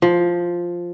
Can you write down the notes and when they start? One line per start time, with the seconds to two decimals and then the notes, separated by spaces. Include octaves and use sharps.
0.02 F3